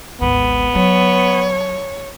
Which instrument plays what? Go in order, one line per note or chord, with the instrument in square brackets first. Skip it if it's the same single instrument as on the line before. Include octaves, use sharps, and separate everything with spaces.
[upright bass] G#1 D2 [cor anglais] B3
[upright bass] F#3 [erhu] C#5